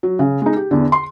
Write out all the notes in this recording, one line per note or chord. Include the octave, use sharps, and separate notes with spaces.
F#3
C#3
G#3 D#4
G4
E2 D3
C6